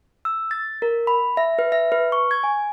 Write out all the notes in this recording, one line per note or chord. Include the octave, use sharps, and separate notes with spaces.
E6
A6
A#4
B5
E5
B4
E5
B4
C#6
G#6
G#5